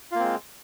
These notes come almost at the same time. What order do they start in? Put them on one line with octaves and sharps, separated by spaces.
F4 A#3 C4 G#3